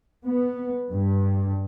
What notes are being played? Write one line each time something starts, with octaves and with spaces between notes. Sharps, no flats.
B3
G2